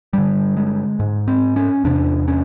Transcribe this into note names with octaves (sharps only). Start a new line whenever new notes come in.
G2 D3 G3
G#3
G#2
C4
C#4
E2 C3 D4
C#4